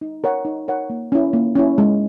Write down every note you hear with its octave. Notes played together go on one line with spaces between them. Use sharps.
D#4
A#4 C#5 F#5
D#4
A#4 C#5 F#5
A#3
C#4 E4
A#3
C#4 E4
G#3